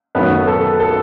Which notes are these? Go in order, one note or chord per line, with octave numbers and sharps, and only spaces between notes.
F#2 D#3 F#3 A3 B3 B4
A4
A4